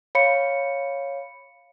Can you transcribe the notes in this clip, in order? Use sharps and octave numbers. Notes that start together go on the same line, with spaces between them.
C#5 F5 B5 C#7